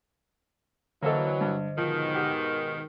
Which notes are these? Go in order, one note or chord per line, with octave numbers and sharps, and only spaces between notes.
D3 E3 F#3 A#3 A4 C5 D#5
G2
G#2 B2 D#3 F3
G4 F#5